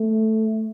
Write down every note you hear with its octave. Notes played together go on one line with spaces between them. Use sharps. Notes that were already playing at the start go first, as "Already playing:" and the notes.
Already playing: A3